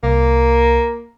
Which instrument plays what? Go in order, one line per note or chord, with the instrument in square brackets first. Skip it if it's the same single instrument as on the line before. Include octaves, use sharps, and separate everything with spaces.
[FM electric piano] C2 [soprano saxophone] A#3